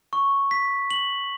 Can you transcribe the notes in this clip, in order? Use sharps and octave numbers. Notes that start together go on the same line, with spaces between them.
C#6
B6
F#7